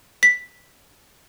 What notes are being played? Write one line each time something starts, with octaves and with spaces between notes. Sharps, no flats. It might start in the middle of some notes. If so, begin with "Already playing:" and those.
B6